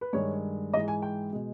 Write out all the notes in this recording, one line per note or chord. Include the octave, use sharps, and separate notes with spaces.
B4
G2 D#3 G#3 C#5
G#2 E3 G#3 D#5
G#5
G5
B2 G#3